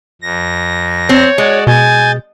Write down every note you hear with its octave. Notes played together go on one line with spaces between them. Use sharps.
F2 A#6
C4 C#5
G#3 F#4 D5
B2 G#5 G6 A6